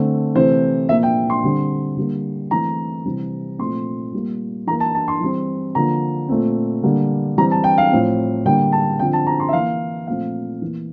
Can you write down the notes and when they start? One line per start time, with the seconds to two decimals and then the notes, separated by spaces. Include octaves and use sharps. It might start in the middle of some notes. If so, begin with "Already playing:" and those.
Already playing: D3 A3 C4
0.35 C3 E3 A3 C4 C5
0.89 A#2 F3 A#3 E5
1.03 G5
1.30 C6
1.44 D3 G3 C4
1.97 D3 G3 A#3
2.51 E3 A3 C4 A#5
3.05 C3 E3 G3 C4
3.59 A#2 F3 A3 C4 C6
4.13 A#2 G3 A#3
4.67 E3 A#5
4.71 A#3
4.80 A5
4.95 A5
5.08 C6
5.21 E3 G3 C4
5.75 D3 F3 A#3 A#5
6.29 A#2 A3 C4
6.83 D3 G3 A#3
7.37 E3 G3 C4 A#5
7.51 A5
7.64 G5
7.78 F5
7.92 A2 F3 C4
8.45 D3 G3 A#3 G5
8.72 A5
8.99 D3 F3 C4 G5
9.13 A5
9.27 A#5
9.40 C6
9.49 E5
9.53 E3 A#3 F5
10.07 A#2 F3 A3 C4 F5
10.62 E3 A#3